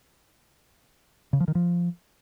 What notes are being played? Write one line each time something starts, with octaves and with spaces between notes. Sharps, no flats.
C#3
F3
D#3
F3